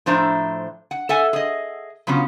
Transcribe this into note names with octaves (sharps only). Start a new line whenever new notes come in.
A2 F3 D4 C5 E5 A#5
F#5
A4 E5 F#5 G#5
G#4 D#5
C#3 F#3 B3 C#4 F4